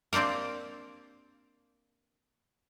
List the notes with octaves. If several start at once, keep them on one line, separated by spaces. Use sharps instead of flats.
A#3 C4 D4 G4 A#4